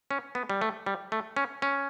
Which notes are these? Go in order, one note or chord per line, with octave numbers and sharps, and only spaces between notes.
C#4
B3
G3
A3
G3
A3
C#4
C#4